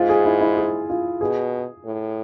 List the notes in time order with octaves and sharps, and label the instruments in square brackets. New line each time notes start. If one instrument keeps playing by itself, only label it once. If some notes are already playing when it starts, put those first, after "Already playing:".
Already playing: [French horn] G#2 [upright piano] F4
[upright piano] G#4
E4
E4
G#4
F4
[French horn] B2 [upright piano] G#4
[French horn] A2